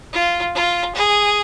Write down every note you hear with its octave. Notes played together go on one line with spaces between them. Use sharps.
F4
F4
G#4